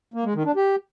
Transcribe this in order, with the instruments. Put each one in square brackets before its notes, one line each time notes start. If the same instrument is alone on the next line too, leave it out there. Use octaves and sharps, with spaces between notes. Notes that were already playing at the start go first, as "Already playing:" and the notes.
[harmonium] A#3
G#3
D#3
D4
G4